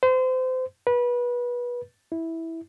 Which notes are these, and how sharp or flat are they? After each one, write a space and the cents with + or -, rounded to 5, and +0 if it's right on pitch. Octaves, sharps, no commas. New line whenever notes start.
C5 -30
B4 -25
E4 -10